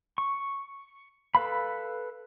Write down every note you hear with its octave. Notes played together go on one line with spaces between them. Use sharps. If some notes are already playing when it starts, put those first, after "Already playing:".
C#6
A4 B4 F5 B5